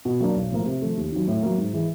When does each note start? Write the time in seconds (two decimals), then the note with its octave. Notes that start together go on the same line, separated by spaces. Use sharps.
0.05 B2
0.20 F#3 A#3 D4
0.36 B1
0.51 A2 F3 A#3
0.66 C3
0.82 F3 A3
0.97 D#2
1.12 D#3 F#3
1.27 A2
1.42 F#3 A#3
1.58 G#2
1.73 E3 G#3